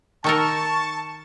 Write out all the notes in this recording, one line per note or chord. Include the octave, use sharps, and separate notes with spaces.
D#3 A4 A#4 A5 C#6